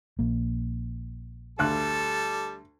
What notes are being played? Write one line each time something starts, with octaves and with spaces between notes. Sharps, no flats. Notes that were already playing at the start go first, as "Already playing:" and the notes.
A#1 A#3
D2 G3 A4 F#6